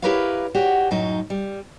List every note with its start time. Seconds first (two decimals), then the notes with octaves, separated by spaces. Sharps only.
0.02 E4 G4 A#4 B4 C#5 F5
0.55 F#4 G4 C#5 D5
0.91 F#2 A2 F#3 D#4
1.30 G3